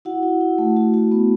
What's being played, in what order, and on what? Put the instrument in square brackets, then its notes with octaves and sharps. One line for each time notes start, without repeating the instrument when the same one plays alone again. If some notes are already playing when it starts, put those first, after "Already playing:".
[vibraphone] E4 F#4 F#5
E4
E4
A3
F#4
F#4
B3